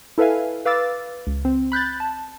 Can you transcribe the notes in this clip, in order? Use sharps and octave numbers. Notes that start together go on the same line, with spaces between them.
E4 A4 B4 E5 F5 G#5
B4 F5 D6 E6 A6
C#2
C4
B5 F#6 G6 A6
A5